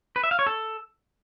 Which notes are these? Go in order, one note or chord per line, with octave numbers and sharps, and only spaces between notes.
B4
E5
F5
C#5
A4